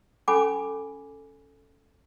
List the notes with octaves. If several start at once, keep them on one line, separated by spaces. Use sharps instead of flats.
C#4 A4 G#5 B5 D6